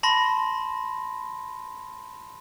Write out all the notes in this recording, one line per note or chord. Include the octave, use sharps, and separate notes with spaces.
A5 B5 C6 A#6